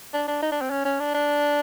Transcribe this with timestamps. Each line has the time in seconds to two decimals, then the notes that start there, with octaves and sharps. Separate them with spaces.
0.13 D4
0.28 D4
0.42 D#4
0.51 D4
0.61 C4
0.70 C#4
0.85 C#4
1.00 D4
1.14 D4